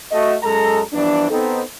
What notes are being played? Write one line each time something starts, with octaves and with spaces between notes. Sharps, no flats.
A3 F#4 D#5
F#2 G#3 A4 A#5
G2 E3 F3 B3 D4
B3 C4 D#4 A4